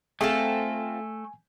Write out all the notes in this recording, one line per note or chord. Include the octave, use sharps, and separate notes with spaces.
A3 C4 F4 G#4 A4 G#5